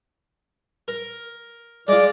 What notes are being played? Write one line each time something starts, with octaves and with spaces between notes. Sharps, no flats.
A#4
G#3 F4 D5